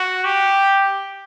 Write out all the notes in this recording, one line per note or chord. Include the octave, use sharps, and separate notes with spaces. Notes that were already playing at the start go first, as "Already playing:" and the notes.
Already playing: F#4
G4